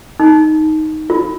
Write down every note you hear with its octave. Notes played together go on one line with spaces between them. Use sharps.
D#4
F4